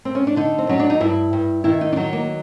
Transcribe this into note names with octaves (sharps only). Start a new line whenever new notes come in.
C4
C#4
D4
D3 D#4
C4
F#3 C#4
D4
D#4
G2 E4
G2
D#3 E4
D#4
D4
F#3 D#4
A#3